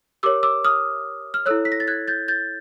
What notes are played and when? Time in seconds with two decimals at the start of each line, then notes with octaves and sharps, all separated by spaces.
0.23 G4 A#4 C#5 D6 E6
0.43 D6 E6
0.65 D#6 F6
1.34 F6
1.46 E4 A4 C#5 E6 F#6
1.65 B6
1.72 A#6
1.80 A6
1.88 F#6 G#6
2.08 G6 A6
2.28 G6 A6